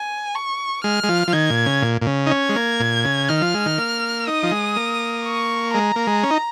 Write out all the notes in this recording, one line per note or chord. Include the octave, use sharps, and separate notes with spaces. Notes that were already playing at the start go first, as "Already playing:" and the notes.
Already playing: G#5
C#6
G#3 F6
G#3
F3
F3
D#3 G#6
A#2
C#3
A#2
A#2
C#3
D#4
C#4 G#6
G#3
A#3
A#2
C#3
D#3 F6
F3
G#3
D#3
A#3
D#4 D#6
F3
G#3
A#3
C#6
G#3 A#5
A#3
G#3
C#4
D#4